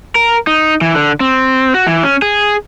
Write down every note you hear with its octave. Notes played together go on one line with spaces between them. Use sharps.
A#4
D#4
E3
D3
C4
F#4
E3
C#4
G#4